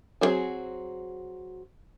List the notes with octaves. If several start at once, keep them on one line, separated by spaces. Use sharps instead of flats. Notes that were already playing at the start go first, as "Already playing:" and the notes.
F#3 B3 C4 F#4 G#4